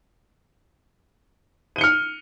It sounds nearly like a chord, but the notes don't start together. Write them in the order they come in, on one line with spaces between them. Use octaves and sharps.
D#7 G7 C#7 F6